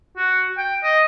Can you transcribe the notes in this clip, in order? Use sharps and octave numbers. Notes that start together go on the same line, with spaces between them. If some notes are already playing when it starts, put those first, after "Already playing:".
F#4
G5
D#5